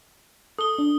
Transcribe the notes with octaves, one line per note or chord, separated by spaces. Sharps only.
A4 D#6 G7
D4